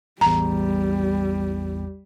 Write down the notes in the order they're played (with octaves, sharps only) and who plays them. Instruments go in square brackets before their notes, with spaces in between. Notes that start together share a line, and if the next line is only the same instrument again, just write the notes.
[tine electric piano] A1 E2 [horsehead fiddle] G3 [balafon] A#5